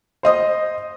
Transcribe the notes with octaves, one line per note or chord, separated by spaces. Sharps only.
C5 D#5 D#6